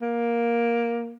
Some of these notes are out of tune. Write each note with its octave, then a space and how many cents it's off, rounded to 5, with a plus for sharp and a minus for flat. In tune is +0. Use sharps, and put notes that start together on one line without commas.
A#3 +10